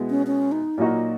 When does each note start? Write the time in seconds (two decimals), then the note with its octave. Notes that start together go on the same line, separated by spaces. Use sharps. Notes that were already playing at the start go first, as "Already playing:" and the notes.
Already playing: B2 G#3 B3 E4
0.10 C#4
0.27 C#4
0.52 D#4
0.78 A#2 F#3 A#3 D#4 E4 F#4
0.95 F4